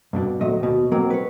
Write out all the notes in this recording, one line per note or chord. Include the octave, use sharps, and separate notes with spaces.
G2 B2 D4
D2 A#2 F#3 A3 D#5 E5
D#2 B2
B2 F#3 A#3 C4 A#4
B4 C#5